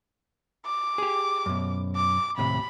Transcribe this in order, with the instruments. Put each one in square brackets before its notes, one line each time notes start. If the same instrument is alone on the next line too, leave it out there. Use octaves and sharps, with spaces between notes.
[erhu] D6
[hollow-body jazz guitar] G4 G#4
F#2 B2
[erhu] D6
[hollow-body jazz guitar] D#2 A2 C3 [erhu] B5